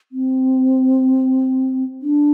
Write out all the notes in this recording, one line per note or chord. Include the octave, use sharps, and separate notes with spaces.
C4
D4